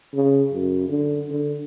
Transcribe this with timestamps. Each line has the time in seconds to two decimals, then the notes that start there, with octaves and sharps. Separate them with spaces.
0.14 C#3
0.53 F#2
0.89 D3
1.30 D3